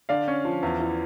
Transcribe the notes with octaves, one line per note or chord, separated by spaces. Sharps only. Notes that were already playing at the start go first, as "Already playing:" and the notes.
D3 D5 F5
C#4
F3
E2
E3